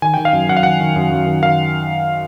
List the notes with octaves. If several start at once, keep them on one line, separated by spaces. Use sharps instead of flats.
D#3 G#5
D#3 G5
F5
F#2
F#2 F#5
F5
D#3 F#5
D#3
F#2
F#2
D#3
D#3 F5